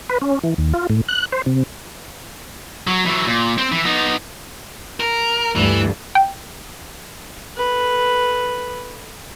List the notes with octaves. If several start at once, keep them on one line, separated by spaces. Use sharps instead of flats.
B4
C#4
E3
D#2
F4
A2
F#6
C5
C3
F#3
E3 F#3
A#2
C4
E3
B3 D#4
A#4
D2 G2 E3
G5
A4 B4